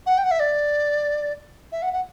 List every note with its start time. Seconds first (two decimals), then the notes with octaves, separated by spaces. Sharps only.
0.06 F#5
0.18 G5
0.24 F#5
0.31 E5
0.40 D5
1.72 E5
1.82 F#5
1.93 F#5